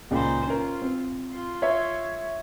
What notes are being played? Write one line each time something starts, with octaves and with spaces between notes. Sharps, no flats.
C#2 A#2 D#4 C5
C#4 F4 A#4
C4
F4 C6
C#5 E5